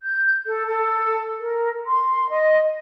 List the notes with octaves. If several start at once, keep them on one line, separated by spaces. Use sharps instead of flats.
G6
A4
A4
A#4
C6
D#5